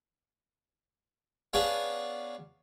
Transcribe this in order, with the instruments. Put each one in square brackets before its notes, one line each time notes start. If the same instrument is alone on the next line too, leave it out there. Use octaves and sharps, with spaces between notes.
[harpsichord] B3 C#4 D4 G#4 F5